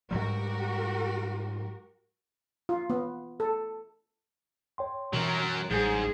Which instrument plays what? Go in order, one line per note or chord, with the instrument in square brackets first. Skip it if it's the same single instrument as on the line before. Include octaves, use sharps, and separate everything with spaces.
[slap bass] G#2 F#3 G3 [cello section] F#4 G4 A#4
[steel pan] F4
B3
A4
[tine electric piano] C#5 G5 C6
[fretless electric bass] B2 E3 [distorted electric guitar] F#3 A#4
[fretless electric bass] A1 F#3 G3 [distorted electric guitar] G#2 [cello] G#4